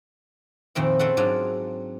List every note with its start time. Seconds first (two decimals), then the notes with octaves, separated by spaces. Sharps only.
0.75 F2 A#2 D#3 C4 E4
0.99 C4 C#4 A4 E5 F#5
1.17 G#2 F#3 D4 F4 D5